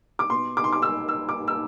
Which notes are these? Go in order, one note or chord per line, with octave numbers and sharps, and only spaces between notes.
D6
B2 C6
D6
C6
D6
E6
E6
D6
E6